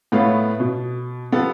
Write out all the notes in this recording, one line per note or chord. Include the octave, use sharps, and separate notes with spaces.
A2 A3 B3 B4 C#5 F5
B2
F3 B3 F4 G4 A4